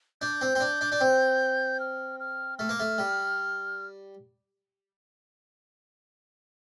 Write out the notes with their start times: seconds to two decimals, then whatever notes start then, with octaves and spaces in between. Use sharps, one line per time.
0.22 D4 G6
0.41 C4
0.55 C4
0.60 D4
0.81 D4
0.92 D4
1.01 C4
1.80 F6
2.20 F6
2.59 A3 F6
2.69 A#3
2.80 A3
2.98 G3